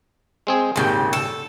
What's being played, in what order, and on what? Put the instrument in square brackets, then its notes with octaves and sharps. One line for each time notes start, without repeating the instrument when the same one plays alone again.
[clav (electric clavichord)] G#3 C4 G#4
[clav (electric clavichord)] G#1 D#2 G5 [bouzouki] A#2 C#3
[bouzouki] A4